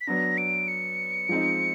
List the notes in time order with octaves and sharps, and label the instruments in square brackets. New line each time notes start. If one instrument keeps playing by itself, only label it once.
[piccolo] B6
[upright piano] F#3 B3 D4 [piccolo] A#6
[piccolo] D7
C#7
[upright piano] F3 G#3 C4 D#4